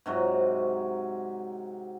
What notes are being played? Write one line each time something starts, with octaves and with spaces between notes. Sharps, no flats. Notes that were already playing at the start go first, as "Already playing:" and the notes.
G#2 C3 F#3